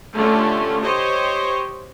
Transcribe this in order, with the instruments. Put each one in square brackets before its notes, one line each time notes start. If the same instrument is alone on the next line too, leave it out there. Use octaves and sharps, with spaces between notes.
[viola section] D3 A3 C#4 F4 G4
G4 C5 C#5 D#5